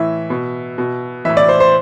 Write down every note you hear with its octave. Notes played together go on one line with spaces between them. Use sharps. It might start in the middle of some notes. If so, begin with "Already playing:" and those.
Already playing: A2 E3 E5
B2
B2
A2 E3 E5
D5
C5
C5